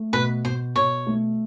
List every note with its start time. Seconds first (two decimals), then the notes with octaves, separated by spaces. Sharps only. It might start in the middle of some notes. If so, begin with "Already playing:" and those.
Already playing: A3
0.13 B2 B4
0.45 B2 C5
0.76 B2 C#5
1.07 A3